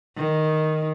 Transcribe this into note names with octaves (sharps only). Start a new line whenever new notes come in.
D#3